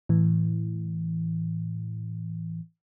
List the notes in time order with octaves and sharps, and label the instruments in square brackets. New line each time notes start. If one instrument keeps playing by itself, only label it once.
[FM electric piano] A2 E3